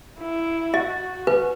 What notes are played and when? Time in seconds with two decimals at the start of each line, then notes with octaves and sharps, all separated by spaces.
0.20 E4
0.74 F#4 D#5
1.27 B4